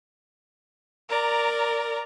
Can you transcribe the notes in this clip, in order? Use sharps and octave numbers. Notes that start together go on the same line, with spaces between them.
A#4 D5 A#5